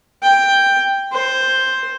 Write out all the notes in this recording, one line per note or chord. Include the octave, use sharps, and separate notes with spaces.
G5
C5